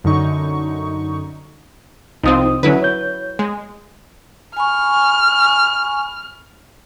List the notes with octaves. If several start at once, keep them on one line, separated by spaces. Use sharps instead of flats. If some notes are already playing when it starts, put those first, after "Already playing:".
F#2 D3 D#4 C#6
C2 F3 C4 D#4 D#6
D3 F#3 C#4 E4 B4
C#5 G6
G#3
G#5 B5 C#6 F6